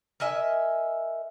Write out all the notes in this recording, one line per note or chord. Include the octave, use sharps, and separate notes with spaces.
A#4 D#5 E5 G#5